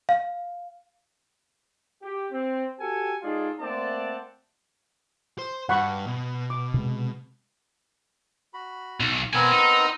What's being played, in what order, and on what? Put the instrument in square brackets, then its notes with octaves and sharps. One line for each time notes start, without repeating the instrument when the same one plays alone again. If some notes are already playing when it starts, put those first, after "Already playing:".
[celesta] F5
[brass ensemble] G4
C4
F#4 G4 A4 G5 G#5
G#3 D#4 F4 G#4 A4 D5
A3 A#3 C4 D5 F#5 A5
[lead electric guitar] C5
[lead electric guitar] G2 [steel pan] F#5 B5 C#6
[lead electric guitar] B2
[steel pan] D6
[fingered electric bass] C3 G#3
[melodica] F#4 B5
[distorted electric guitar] B1
[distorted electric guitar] B2 G#5 [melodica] B3 C4 A#4
[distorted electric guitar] D#4